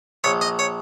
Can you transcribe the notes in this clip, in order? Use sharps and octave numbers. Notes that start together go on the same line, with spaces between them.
A#1 C#5
D#5
C#5